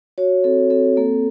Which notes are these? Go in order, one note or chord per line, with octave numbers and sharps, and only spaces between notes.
F#4 C#5
C4 A4
C4 A4
A#3 A4